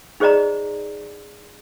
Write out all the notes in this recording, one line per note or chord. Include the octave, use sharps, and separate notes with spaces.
D#4 G#4 C5 D5 D#5 A#5